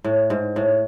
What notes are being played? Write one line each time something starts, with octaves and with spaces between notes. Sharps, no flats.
A2
G#2
A2